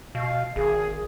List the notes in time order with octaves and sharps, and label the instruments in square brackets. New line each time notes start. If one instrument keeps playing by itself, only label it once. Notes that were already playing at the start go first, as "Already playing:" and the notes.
[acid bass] B2 [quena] F5
[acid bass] G#1 [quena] G#4